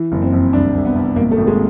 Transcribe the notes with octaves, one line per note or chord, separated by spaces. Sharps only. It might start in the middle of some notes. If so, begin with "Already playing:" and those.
Already playing: E3
F#1
C4
F2
C2 D4
C2
B3
C2
G#1 A#3
A3
G#1
G#3